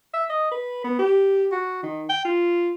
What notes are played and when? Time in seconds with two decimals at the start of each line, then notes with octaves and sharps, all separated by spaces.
0.14 E5
0.30 D#5
0.52 B4
0.84 B3
0.99 G4
1.52 F#4
1.83 D#3
2.10 G5
2.25 F4